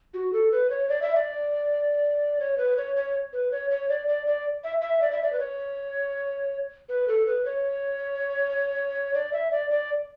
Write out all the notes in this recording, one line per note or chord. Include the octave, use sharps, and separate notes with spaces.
F#4
A4
B4
C#5
D5
E5
D5
C#5
B4
C#5
C#5
B4
C#5
C#5
D5
D5
D5
E5
E5
D5
E5
D5
B4
C#5
B4
A4
B4
C#5
D5
E5
D5
D5